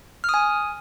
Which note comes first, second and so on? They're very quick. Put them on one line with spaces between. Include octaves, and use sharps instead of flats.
F6 D#6 G#5